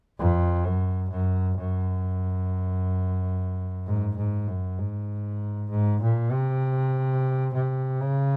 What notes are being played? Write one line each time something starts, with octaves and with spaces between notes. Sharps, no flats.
F2
F#2
F#2
F#2
G#2
G#2
F#2
G#2
G#2
A#2
C3
C3
C#3